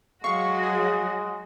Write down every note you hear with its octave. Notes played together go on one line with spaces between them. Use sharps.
F#3 G#3 F#4 F5 C#6
G#4